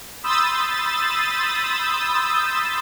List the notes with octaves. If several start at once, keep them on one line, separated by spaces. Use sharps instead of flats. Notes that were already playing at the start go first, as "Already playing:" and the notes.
B5 C6 D#6 E6 G6 A6